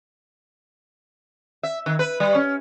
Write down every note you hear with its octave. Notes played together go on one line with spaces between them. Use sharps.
E5
D#3
B4
G3
C#4